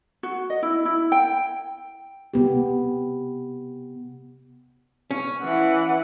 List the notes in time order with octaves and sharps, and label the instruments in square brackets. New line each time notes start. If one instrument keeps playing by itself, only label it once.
[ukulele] F#4
D#5
E4
E4
G5
[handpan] C3 B3 G4
[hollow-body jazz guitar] C#4
[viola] E3 F#5